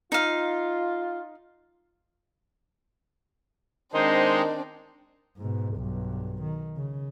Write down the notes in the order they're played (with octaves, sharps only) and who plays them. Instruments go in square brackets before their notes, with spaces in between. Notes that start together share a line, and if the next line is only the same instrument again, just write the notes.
[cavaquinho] D#4 F5 [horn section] F4
[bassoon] D#3 [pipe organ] G#3 D#4 [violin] C4 D4 [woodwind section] C5 C6
[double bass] G#2 B2
B1 G2
D#3
C#3